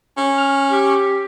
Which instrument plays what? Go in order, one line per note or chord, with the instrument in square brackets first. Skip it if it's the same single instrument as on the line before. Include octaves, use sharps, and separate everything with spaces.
[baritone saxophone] C#4
[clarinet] F6
G4